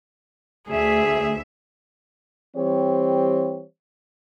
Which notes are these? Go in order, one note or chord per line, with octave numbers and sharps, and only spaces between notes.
D2 G#4 E5
E3 G3 C4 G4 C5 C#5